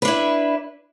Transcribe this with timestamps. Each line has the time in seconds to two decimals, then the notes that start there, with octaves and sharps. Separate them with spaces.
0.02 B4
0.05 D4
0.08 E4